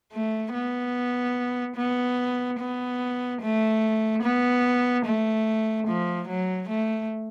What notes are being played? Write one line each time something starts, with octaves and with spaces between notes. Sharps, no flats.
A3
B3
B3
B3
A3
B3
A3
F3
F#3
A3